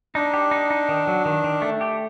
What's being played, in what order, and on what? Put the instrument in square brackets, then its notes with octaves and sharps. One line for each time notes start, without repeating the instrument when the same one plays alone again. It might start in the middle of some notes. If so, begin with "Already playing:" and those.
[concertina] D4 [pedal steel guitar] D#4
[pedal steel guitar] G4
D#4
D#4
D#3
F#3
D#3
D#3
A3
G4